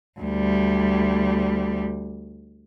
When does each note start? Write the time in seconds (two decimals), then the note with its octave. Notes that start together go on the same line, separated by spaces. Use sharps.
0.20 D2 G3